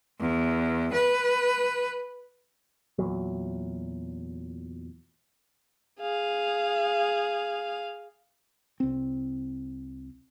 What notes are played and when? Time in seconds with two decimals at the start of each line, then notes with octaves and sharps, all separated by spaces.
0.21 E2
0.93 B4
2.98 E2 A#2 F#3
6.01 G#4 F5
8.80 C2 C4